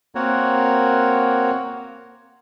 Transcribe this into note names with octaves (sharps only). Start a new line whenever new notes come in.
A#3 C4 F#4 A#4 C#5 F#5